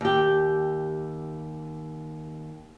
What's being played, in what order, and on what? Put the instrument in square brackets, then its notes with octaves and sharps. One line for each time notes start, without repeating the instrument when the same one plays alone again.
[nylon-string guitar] D#2 G4